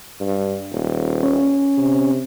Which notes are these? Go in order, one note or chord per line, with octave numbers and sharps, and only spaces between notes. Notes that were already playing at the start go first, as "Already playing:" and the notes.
G2
D#1
C#4
C3